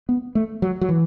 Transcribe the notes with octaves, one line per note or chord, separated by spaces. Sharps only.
B3
A3
F#3
F#3
E3